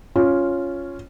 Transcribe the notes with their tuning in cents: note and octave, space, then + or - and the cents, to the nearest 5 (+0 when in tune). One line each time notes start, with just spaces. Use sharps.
C#4 +0 F4 +0